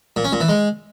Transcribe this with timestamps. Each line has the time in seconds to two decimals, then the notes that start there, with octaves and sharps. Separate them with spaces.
0.16 A#2
0.25 C#4
0.33 A#2
0.41 E3
0.49 G#3